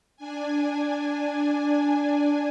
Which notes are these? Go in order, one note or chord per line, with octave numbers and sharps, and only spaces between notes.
D4 G#5